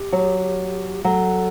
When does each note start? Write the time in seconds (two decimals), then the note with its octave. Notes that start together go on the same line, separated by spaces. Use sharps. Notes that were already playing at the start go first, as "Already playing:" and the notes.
Already playing: G4
0.12 F#3
1.04 F#3 A4